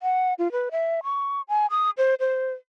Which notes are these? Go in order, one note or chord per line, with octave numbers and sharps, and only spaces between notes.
F#5
F4
B4
E5
C#6
G#5
D#6
C5
C5